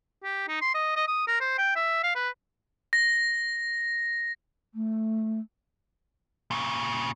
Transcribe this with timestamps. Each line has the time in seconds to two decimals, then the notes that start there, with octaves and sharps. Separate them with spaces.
0.24 G4
0.48 D#4
0.61 C6
0.74 D#5
0.96 D#5
1.08 D#6
1.27 A#4
1.40 C5
1.58 G5
1.76 E5
2.03 F5
2.15 B4
2.93 A#6
4.73 A3
6.51 A#2 C#3